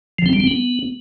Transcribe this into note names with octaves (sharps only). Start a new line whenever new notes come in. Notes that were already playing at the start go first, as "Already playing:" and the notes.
F3
C4
G3
C4
B3